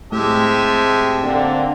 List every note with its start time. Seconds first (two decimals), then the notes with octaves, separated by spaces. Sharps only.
0.12 A2 G#3 C4 G4 E5 G5 A5
1.23 D3 A#3 C4